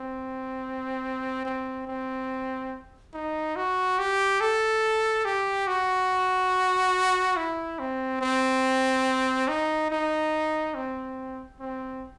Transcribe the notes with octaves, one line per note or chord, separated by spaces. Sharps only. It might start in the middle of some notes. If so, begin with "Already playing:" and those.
Already playing: C4
C4
C4
D#4
F#4
G4
A4
G4
F#4
E4
C4
C4
D#4
D#4
C4
C4